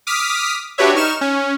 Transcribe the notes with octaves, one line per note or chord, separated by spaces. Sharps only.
D6 D#6 F6 B6
D4 F#4 G4 B4 C#5 E5
D#4 C#6 F6 E7
C#4